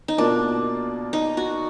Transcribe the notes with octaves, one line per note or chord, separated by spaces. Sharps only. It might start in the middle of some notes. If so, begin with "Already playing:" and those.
D#4
B2 A#3 D4 F4 A#4 D5
D#4
F#4